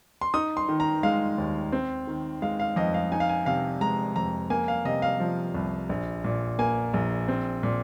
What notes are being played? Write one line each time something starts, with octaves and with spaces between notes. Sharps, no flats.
C6
D#4 D#6
C6
D#3
A#5
G#3 F5
D#2
C4
D#3
G#3 F5
F5
F2 D#5
F5
D#4 G#5
F5
G#5
C3 F5
G#3 A#5
F2 A#5
A#3 G#5
F5
C3 D#5
F5
F3
C2
A#1
A#2
A#3 G#5
A#1
C4
A#2